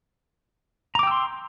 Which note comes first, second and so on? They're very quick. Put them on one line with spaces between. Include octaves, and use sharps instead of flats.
A#5 D6 G5 E6 C6